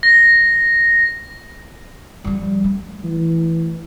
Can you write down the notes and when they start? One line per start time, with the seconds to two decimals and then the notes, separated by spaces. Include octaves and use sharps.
0.03 A#6
2.24 F3 G3
2.64 A3
3.04 E3